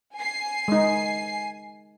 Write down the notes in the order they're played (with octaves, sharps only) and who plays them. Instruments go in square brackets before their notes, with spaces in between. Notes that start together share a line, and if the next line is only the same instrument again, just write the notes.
[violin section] G#5 C7
[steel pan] G#3 D#4